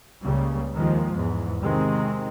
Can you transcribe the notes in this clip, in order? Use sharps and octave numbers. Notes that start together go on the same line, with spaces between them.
C#2 C#3 G3 A#3
D#2 D#3 F3 G#3
E2 G#2
C3 D#3 G#3 C4